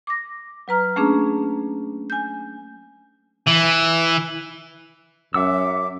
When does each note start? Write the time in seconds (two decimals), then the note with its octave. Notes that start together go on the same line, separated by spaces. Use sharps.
0.07 D6 A#6
0.68 F#3 B4 A#5 F6
0.96 A3 A#3 C#4 D4 G#4
2.10 G#5 G6
3.47 E3
5.34 F#2 E5 F#5 D6 E6